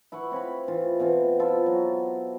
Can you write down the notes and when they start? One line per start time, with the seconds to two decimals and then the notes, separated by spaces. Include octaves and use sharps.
0.12 E4 B4 F#5 C#6
0.31 C4 C#5 F5 B5
0.68 E3 F4
0.99 B2 E3 C4 F4
1.40 E4 F4 A4
1.66 F#3